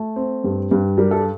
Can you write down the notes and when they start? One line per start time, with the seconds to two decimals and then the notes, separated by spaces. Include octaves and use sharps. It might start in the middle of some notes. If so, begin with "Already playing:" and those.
Already playing: A3
0.16 C4
0.44 G2
0.71 G2
0.98 G3 A#4
1.11 A4